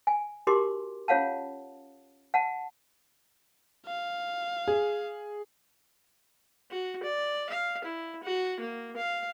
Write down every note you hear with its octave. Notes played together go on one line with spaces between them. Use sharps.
G#5
D#4 F#4 G4 A#4 C6 D6
C#4 F4 C#5 F5 F#5 A5
F#5 A5
F5
G#4
F#4
D5
F5
E4
F#4
A#3
F5